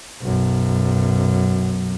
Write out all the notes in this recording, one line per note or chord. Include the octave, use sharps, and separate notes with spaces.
B1 F#2